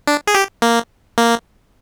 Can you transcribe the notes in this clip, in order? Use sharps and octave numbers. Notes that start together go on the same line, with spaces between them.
D4
G#4
G4
A#3
A#3